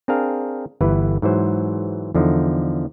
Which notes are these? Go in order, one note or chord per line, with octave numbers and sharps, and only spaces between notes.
C4 D4 G#4 A#4 F5
G1 E3 B4
G#2 E3 F#3 C5
E2 D3 F3 D#4